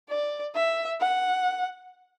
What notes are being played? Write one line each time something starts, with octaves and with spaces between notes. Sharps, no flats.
D5
E5
F#5